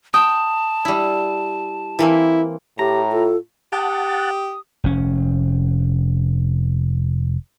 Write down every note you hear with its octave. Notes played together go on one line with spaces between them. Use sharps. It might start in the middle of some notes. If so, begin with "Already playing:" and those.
G5 A5 D#6
G3 E4
E3 A#3 C4 E4
A2 G4 A#5
F4 A4
G4 F#5 A5 D#6
F1 C#4